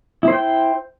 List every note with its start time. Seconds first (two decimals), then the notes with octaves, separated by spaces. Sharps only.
0.23 E4
0.28 C5
0.33 G5